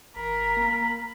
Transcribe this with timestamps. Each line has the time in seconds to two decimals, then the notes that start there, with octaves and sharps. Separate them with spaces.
0.16 A1 A#4 B5
0.57 A#3